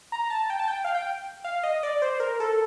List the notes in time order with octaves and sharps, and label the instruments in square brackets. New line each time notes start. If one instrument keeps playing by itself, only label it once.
[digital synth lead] A#5
A5
G5
A5
G5
F5
G5
F5
D#5
D5
C5
A#4
A4